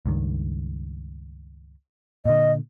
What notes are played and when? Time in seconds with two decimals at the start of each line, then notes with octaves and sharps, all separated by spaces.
0.06 C#2 G2 D#3
2.25 A#2 D3 D#5